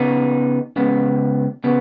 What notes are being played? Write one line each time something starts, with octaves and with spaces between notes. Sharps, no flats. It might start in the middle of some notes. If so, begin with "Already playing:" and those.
Already playing: C#3 B3 D#4
C#2 C#3 B3
C#3 B3